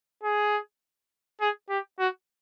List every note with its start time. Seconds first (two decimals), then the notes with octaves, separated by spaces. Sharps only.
0.23 G#4
1.41 G#4
1.70 G4
1.99 F#4